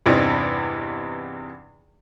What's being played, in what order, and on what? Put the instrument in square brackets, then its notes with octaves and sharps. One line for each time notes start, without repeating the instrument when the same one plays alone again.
[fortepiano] E2 G2 C3 E3 D#4